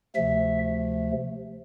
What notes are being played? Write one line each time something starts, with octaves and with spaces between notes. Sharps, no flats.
D2 C3 F3 A3 E5